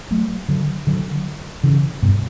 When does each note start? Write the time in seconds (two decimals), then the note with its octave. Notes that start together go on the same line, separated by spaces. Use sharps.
0.11 F#3 A3
0.48 D3 F#3
0.87 D3 F#3
1.64 C#3 E3
2.03 G2 B2